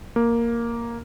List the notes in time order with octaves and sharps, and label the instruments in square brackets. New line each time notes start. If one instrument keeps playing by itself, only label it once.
[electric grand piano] A#3